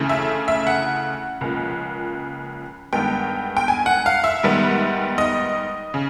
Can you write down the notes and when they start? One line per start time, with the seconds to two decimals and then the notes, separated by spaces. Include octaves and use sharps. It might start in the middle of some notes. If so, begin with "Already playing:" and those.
Already playing: D2 C#3 E3 A3
0.09 E5
0.48 E5
0.67 F#5
1.41 C#2 C#3 F3 A#3
2.93 G2 D#3 G#3 B3 G5
3.57 G5
3.68 G#5
3.86 F#5
4.06 F5
4.24 E5
4.43 G#2 D#3 G3 B3
5.18 D#5
5.94 C#3